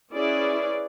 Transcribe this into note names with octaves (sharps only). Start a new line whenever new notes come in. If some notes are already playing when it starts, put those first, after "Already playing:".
C#4 E4 G#4 B4 D5